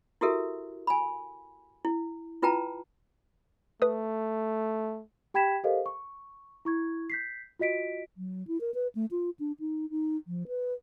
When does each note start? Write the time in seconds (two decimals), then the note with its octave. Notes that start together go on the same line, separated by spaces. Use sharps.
0.21 E4 F#4 G4 A4 A#4 E5
0.87 G#5 B5
1.85 E4
2.42 E4 F4 B4 G5 A5 A#5
3.82 A3 B4 D#6
5.34 G4 G5 B5 G#6 B6 E7
5.64 G4 A4 A#4 C5 D#5 F5
5.86 C#6
6.65 E4 C#6 G#6
7.10 G6 B6 C7
7.59 F4 F#4 D#5 B6 D7
8.17 F#3
8.48 E4
8.61 A#4
8.74 B4
8.95 A3
9.11 F4
9.39 D4
9.60 D#4
9.90 D#4
10.27 F3
10.48 B4